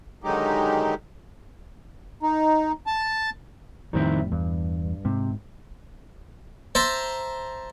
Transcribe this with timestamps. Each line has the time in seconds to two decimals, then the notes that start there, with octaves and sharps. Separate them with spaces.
0.24 D3 D#3 F#3 G#3 D#4 G4
2.23 D#4
2.87 A5
3.93 F2 A2 D#3 G3 C4 E4
4.32 E2 G2
5.05 G#2 C3
6.75 C5 E5 A5 A#5